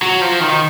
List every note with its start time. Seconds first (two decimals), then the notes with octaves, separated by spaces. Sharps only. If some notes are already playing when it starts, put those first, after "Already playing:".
0.02 F#3
0.22 F3
0.41 D#3